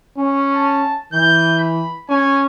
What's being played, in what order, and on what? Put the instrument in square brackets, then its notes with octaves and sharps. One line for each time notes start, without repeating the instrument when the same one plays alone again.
[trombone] C#4
[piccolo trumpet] A5
[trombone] E3 [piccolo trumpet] G6
[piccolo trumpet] B5
[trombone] C#4 [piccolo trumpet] G#5